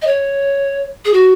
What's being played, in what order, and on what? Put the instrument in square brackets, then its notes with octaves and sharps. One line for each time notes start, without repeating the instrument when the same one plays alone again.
[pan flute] D#5
C#5
G#4
F#4